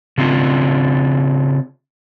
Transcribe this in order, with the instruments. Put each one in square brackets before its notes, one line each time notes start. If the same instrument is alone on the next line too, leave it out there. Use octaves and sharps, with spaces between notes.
[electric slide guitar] C#3 C4 D4 F4